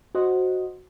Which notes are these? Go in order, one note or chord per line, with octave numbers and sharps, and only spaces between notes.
F#4 C5 D#5 F#5